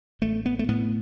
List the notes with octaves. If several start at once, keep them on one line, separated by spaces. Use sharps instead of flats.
A1 A3
B3
A3
A2 B3